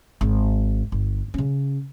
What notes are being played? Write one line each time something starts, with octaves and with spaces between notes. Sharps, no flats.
G#1
G1
C#3 C#4